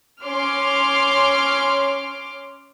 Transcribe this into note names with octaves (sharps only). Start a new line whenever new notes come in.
C#4 C6 D6 F6